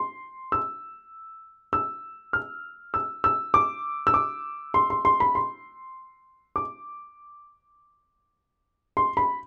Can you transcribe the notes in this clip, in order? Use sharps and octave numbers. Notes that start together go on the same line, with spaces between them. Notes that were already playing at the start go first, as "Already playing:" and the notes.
Already playing: C6
E6
E6
F6
E6
E6
D6
E6
D6
C6
C6
C6
B5
C6
D6
C6
B5